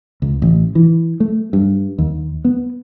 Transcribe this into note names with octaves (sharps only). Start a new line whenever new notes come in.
C#2
A1
E3
A3
G2
D#2
B3